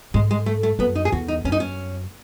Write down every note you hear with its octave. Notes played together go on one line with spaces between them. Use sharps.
G#2 G#3
G#3
A3
A3
F#2 B3
D#4
G#4
E2 F#4
D#4
F#2 C#4
D#4
C#4